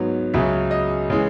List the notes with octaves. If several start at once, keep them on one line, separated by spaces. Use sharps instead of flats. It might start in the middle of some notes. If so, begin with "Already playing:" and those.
Already playing: G#2 F#3 B3
C#2 C#3 F#3 C#4 E5
D#5
C#3 E3 G#3